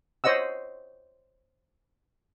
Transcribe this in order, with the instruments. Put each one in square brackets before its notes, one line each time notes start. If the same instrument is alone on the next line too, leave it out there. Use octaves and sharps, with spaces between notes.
[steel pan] C5 C#5 D#5 F#5 E6